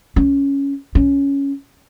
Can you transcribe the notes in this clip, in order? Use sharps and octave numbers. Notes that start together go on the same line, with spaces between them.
C#4
C#4